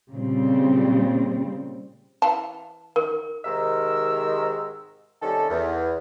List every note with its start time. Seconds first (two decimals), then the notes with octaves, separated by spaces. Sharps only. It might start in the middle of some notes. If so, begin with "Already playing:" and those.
0.12 A#2 C#3 G3 C4
2.22 E3 F5 A5
2.96 D#3 A#4
3.45 G#2 C3 D#3 G#3 A#4 E6
5.22 C3 D#3 G3 C#4 A4
5.50 E2